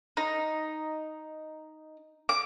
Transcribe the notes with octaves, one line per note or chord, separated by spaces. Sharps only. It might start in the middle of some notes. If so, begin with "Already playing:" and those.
D#4
D6